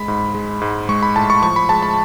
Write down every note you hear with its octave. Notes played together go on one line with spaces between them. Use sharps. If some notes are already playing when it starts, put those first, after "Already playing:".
Already playing: G#3 B5
G#2
G#3
G#2
G#3 C#6
B5
A2 A5
C#6
F3 C#6
B5
G#3 A5
B5